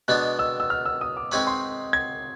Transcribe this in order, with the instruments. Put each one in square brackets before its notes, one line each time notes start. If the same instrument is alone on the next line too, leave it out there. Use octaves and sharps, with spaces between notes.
[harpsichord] B2 G#3 B3 D4 [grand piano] F#6
[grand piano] E6
E6
F6
E6
D#6
D6
[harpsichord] G#3 C4 D#4 G#4 B4 [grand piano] C#6
[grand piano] C6
G#6